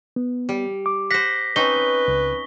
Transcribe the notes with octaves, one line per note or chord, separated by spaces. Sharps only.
B3
G3
D6
C5 F#5 A#6 B6
C4 C#4 D#4 B4 C#6 G7
C#2